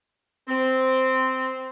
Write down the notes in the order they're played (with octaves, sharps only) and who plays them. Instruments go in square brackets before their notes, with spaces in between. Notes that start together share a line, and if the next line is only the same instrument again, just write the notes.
[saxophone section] C4